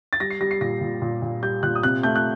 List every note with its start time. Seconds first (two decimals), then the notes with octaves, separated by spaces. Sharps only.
0.13 A6
0.20 G3 A#6
0.30 C7
0.41 G3 A#6
0.51 C7
0.61 A#2 A#6
0.81 A#2
1.02 A#2
1.22 A#2
1.42 G3 G6
1.63 A#2 F#6
1.75 D#6
1.83 C3 F#6
2.03 A3 G6
2.16 F#6